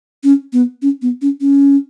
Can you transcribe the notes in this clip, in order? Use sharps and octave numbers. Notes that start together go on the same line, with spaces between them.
C#4
B3
C#4
B3
C#4
C#4